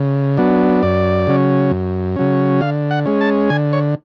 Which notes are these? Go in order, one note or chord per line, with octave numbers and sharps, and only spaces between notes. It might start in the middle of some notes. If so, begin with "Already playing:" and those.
Already playing: C#3
F#3 B3 D4
F#2 D5
C#3 F#3 C#4
F#2
C#3 F#3 C#4
D3 F5
F#5
G#3 C#4
A5
D3 G#5
C#5